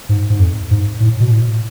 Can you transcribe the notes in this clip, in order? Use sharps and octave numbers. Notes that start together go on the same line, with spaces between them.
G#2
G#2
F2
G#2
A2
B2
A2